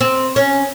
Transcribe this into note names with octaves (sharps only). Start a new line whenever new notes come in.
C4
C#4